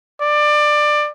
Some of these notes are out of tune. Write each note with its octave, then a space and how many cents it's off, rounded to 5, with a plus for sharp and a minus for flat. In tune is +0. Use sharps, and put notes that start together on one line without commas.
D5 +20